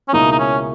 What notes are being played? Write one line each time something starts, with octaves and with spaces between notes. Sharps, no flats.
C#4
C#2 B2 A#3 D#4 E4
D#4
C#4